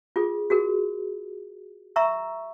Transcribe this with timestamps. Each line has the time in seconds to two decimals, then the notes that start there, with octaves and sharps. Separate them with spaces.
0.16 F4 G#4 A4
0.50 F#4 G#4 A#4
1.96 E5 A#5 C#6 E6